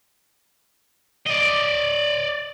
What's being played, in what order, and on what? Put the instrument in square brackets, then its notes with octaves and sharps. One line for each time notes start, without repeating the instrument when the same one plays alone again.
[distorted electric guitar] D5 D#5